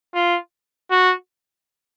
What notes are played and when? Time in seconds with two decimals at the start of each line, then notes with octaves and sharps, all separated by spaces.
0.15 F4
0.91 F#4